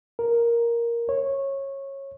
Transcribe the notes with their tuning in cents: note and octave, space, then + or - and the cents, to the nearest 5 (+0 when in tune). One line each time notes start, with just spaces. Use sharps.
A#4 +5
C#5 -15